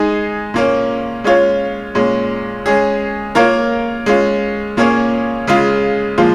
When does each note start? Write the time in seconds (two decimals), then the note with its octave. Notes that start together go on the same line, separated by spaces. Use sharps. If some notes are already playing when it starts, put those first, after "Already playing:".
Already playing: G#3 D#4 G#4
0.54 A#2 A#3 C#4
1.24 G#3 C#4 F4 C#5
1.95 A#2 G#3 C#4
2.66 G#3 C#4 G#4
3.35 A#3 F4 A#4 C#5
4.06 G#3 C#4 F4
4.77 A#2 A#3 C#4 G#4 C#5
5.47 C#3 G#3 F4
6.18 A#2 F3 G#3 F4